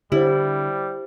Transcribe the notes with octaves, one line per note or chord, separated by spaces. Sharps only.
D3 G3 E4 G4 C5